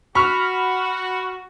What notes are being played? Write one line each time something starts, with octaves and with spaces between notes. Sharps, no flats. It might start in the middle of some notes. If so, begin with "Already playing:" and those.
F#4 B5 C#6 F6